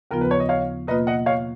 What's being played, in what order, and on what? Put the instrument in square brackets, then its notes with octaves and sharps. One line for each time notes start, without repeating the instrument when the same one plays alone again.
[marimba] D#2 C#3 F3 B3 F4 [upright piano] A#4
[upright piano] B4
C#5
D#5
C#5 F5
[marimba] B2 A#3 F4 [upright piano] B4 D#5
[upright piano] D#5 F#5
C#5 F5